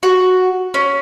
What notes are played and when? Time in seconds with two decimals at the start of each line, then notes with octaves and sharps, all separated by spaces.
0.03 F#4
0.74 C#4